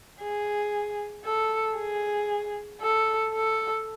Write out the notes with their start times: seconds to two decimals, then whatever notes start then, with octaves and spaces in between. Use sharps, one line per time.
0.21 G#4
1.25 A4
1.76 G#4
2.81 A4
3.34 A4